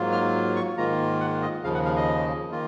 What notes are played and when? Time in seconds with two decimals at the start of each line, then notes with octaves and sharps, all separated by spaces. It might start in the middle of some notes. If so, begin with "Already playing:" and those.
Already playing: G#2 F#3 A#3 F4
0.12 F6
0.56 C#6
0.77 G#2 D#3 A#3 F4 A#5
1.20 F#5
1.42 D#5
1.64 D#2 C#3 F3 F5
1.74 F#5
1.85 F5
1.96 D#5
2.51 D#3 A#3 F4